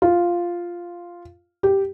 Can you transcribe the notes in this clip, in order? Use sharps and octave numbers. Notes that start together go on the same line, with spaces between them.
F4
G4